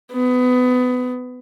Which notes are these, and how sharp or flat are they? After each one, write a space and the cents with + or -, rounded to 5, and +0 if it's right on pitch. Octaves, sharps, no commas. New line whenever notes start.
B3 +25